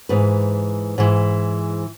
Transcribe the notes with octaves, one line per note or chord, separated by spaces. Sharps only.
G#2 E3 B4
G#2 E3